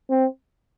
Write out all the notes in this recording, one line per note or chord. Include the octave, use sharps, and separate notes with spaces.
C4